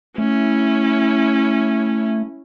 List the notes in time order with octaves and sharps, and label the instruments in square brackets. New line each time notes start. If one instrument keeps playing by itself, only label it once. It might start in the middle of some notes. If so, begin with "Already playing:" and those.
[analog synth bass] A3 [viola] C#4 E4